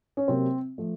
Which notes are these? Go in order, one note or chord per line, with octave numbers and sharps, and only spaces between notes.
C#4
C3 F#3 A#3 C4
F3 A3